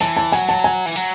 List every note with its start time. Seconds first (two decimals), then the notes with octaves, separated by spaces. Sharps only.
0.01 E3 A5
0.17 A5
0.32 F#3 G#5
0.49 A5
0.64 G#5
0.86 E3
0.96 F#3